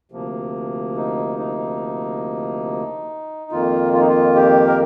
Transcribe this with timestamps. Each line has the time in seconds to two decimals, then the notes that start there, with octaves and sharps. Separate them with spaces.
0.12 D2 C3 F3 A#3
0.97 D#4
1.39 D#4
3.51 F2 D#3 A#3 F4
3.93 F4
4.01 D#4
4.08 F4
4.36 G4
4.67 A#4